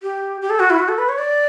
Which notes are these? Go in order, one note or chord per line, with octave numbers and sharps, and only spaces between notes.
G4
G4
A4
F#4
E4
F#4
A4
B4
C#5
D5